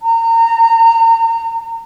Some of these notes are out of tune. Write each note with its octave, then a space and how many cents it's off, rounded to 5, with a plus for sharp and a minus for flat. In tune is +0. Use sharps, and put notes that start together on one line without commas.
A#5 -30